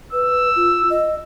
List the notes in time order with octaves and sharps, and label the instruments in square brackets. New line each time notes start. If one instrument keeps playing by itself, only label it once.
[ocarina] B4 [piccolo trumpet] E6
[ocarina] F4
D#5